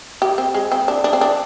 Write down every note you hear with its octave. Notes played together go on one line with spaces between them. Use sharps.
G4
C4
G#3
C4
D4
D4
C4
D4